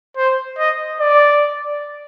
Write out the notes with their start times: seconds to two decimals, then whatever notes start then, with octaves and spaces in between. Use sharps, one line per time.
0.17 C5
0.58 D#5
1.00 D5